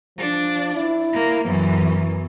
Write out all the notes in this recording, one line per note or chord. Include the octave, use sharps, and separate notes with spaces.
F3 D4
E4
A#3
F#2 E3 B3